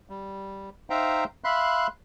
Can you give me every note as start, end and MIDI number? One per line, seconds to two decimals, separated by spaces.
0.10 0.70 55
0.90 1.24 63
0.90 1.24 72
0.90 1.24 76
0.90 1.24 77
0.90 1.24 79
0.90 1.24 82
1.44 1.87 76
1.44 1.87 77
1.44 1.87 83
1.44 1.87 84
1.44 1.87 90